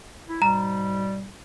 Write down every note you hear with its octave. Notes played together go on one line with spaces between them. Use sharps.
E4
G#2 B2 G3 A#5